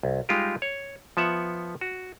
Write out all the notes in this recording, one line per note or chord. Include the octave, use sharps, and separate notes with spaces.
C2
G3 G#3 D#4 F4 G4
C#5
F3 B3 E5 F#5
F#4